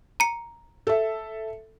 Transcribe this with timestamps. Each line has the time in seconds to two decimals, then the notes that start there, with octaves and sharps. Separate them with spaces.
0.20 A#5 C#7
0.87 A4 E5